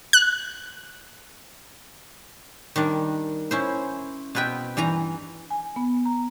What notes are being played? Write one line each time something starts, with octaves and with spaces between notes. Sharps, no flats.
F#6
D#3 G3 D4
C#4 E4 C5
B2 C4 B4 E5 G5
G2 E3 G#5 A#5
G#5
B3
A#5